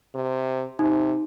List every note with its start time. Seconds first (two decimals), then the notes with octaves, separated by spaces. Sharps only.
0.15 C3
0.79 C3 D#4